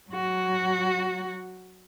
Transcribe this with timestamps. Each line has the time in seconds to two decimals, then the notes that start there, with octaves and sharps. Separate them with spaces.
0.10 F#3 F#4